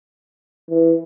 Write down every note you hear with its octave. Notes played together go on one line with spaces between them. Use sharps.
E3